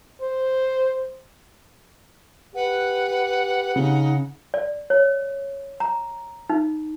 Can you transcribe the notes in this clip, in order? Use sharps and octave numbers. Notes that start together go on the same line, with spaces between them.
C5
G4 B4 F#5
C#3 D#4
D5
C#5
A#5
D#4